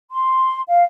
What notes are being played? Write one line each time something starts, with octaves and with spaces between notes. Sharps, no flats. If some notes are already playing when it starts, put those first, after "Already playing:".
C6
F5